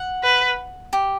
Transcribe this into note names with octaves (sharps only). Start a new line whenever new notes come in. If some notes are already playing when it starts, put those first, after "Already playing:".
Already playing: F#5
B4
G4